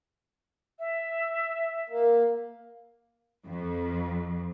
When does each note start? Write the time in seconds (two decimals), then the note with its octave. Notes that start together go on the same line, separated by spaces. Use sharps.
0.79 E5
1.90 A#3
3.47 F2